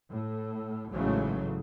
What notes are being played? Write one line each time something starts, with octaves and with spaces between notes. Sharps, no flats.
A2
A1 G#2 C#3 E3 F#3 A3